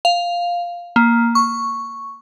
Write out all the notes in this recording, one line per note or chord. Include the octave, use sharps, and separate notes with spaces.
F5
A#3
C#6